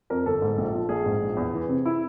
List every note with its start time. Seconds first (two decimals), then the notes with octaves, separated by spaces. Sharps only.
0.10 F2 A#4
0.26 G1 A4
0.42 G#2
0.58 A#1
0.74 F3
0.89 A#1 G#4
1.05 G#2
1.21 A#1
1.37 E2
1.53 E3
1.69 C3
1.86 E4